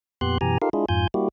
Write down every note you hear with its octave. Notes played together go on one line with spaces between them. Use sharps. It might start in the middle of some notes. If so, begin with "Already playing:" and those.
F2 A#2 B3 G4 C6 F#6
F#2 B2 E3 G4 G#5 A#5
D#4 F4 G4 A4 A#4 F5
G#3 D4 E4 F4 G#4
F2 G#2 F4 G#5 G6
G3 A#3 E4 F#4 G4